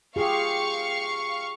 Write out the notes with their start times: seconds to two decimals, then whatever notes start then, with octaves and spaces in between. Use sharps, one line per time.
0.16 F4 G4 G#4 F5 C#6